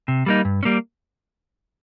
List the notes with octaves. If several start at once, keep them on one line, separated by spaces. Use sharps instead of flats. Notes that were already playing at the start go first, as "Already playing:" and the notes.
C3
G3 A#3 D#4
G2
C#4
G3 A#3